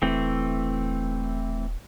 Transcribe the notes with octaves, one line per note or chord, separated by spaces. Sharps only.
D#1 E3 A3 C4